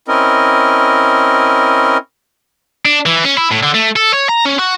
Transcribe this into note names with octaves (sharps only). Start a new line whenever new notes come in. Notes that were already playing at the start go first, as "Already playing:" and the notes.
C4 C#4 E4 A#4 D#5
D4
E3
C#4
E4
A2
D3
A3
A4
C#5
A#5
C#4
F#4